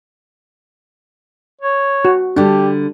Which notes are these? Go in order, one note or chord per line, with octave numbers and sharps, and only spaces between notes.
C#5
F#4
D3 G3 D4 G4